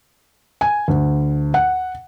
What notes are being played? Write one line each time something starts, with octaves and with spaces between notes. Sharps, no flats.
G#5
D2
F#5